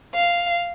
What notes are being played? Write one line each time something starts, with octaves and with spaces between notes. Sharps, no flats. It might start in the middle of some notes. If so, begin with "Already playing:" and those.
F5